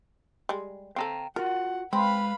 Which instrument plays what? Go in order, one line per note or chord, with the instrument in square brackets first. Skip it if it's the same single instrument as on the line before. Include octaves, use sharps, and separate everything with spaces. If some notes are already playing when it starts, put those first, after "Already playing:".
[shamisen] G3 G#3
[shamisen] C4 G#4 A4 [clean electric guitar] F5 G5 A#5
[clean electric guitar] F4 F#4 [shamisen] A#4 [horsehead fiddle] F#5
[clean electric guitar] G#3 [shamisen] C4 [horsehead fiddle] B4 F5 [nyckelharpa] B5